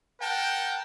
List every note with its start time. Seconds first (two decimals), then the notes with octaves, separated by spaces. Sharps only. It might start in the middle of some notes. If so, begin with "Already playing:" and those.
0.21 A#4 F#5 G5 A5